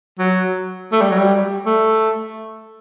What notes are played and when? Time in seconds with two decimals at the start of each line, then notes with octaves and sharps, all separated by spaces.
0.19 F#3
0.92 A3
1.01 G3
1.10 F#3
1.19 G3
1.66 A3